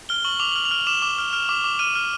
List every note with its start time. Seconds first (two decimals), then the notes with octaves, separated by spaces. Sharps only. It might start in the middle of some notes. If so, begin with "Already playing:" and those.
0.09 F6 G7
0.25 C#6 F#7
0.40 D6 F7
0.52 F6 F#7
0.65 F7
0.71 F6
0.87 D6 E7
1.02 D6
1.18 F6
1.33 F6
1.49 D6
1.64 D6
1.79 F6 D#7
1.95 F6